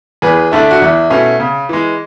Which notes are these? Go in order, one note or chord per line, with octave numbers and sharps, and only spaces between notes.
E2 G#4 B4
D3 A3 D4 E4
F#4
E2 E4
B2 A3 C#4 E4
C#3
E3 G#3